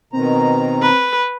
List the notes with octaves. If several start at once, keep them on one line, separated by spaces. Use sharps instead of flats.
B2 D#3 C4 A#5
B4